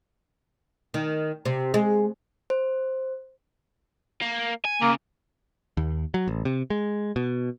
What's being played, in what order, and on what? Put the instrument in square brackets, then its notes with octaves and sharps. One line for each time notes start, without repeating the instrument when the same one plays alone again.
[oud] D#3
C3
G#3
[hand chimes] C5
[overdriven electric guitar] A#3
G#5
[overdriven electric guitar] C#3 [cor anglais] A#3
[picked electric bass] D#2
F#3
A1
C3
G#3
B2